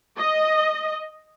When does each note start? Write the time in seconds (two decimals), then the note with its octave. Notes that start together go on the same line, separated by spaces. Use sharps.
0.19 D#5